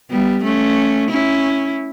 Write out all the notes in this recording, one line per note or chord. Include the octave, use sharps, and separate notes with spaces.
G3 B3
A3 C#4
C#4 E4